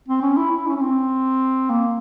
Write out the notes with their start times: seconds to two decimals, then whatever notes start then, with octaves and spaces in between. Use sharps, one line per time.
0.08 C4
0.22 C#4
0.37 E4
0.51 E4
0.67 C#4
0.77 C#4
0.81 C4
1.70 A#3